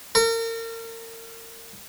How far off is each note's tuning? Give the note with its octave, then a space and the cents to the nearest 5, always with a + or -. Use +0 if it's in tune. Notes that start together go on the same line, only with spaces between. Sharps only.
A#4 -35